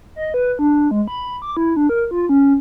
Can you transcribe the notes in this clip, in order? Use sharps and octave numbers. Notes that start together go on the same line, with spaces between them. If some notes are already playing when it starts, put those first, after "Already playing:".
D#5
B4
D4
G#3
B5
D6
E4
D4
A#4
F4
C#4